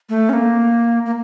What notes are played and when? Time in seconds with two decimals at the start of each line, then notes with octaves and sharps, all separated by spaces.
0.09 A3
0.29 C#4
0.33 A#3
1.06 A#3